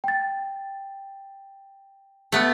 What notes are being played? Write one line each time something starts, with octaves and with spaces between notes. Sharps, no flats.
G5 A6
A3 B3